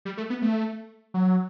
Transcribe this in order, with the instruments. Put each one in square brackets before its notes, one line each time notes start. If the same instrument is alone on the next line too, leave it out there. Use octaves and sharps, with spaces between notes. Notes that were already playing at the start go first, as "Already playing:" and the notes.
[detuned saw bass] G3
A3
B3
A3
F#3